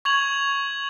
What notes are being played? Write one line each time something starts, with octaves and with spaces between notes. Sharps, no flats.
C#6 G#6 F7 F#7